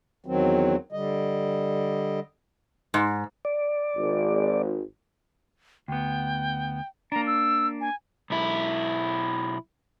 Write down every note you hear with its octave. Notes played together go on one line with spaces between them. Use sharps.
E2 D#3 F#3 C4
D3 G3 D#5
G#2
D5
G#1
D2 B3 G5
A#3 D4 A#5
E6
G#5
B1 E4